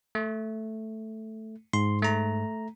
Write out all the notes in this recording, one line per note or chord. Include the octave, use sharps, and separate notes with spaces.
A3
G#2 C6
A3 A#5